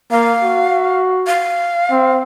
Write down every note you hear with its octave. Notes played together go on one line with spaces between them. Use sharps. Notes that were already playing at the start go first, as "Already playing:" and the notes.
A#3 F5
F#4
F5
C4